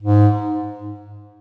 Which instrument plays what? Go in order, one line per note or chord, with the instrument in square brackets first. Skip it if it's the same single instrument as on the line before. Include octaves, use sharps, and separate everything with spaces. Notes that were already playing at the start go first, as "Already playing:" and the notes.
[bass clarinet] G#2